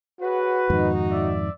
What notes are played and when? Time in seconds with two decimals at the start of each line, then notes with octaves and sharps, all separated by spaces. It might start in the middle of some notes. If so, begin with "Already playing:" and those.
0.21 F#4 G#4 B4 C#5 F#5
0.70 F2 G#2 D#3 D#4
1.10 D5 E5